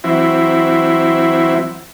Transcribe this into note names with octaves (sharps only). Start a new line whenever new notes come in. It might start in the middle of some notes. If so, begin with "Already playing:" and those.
E3 F#3 C4 E4